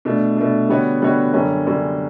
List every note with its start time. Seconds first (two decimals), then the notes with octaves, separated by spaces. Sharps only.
0.05 B2 A3 D4
0.36 B2 A3 D4
0.69 D3 G3 B3 F#4 C#5
1.02 D3 G3 B3 F#4 C#5
1.33 F#2 D3 G3 C#4
1.65 F#2 D3 G3 C#4